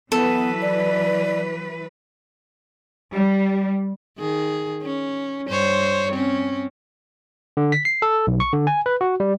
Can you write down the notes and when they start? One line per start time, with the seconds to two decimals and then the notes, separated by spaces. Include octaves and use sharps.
0.12 E3 F#3 B3 A4 B4
0.62 D5
3.14 G3
4.18 D#3 G#4
4.83 C#4
5.48 G2 C5 C#5
6.12 C4 C#4
7.57 D3
7.72 B6
7.85 C7
8.02 A4
8.27 B1
8.40 C#6
8.53 D3
8.67 G#5
8.86 B4
9.01 F#4
9.20 G3